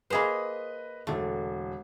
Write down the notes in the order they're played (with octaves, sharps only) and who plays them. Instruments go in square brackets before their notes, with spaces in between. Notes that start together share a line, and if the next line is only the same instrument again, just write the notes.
[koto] A#3 G#4 C5 [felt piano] B4 D#5 B5
[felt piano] E1 D3 [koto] A3